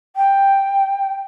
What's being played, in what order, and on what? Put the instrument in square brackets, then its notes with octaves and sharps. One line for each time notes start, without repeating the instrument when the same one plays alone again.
[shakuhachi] G5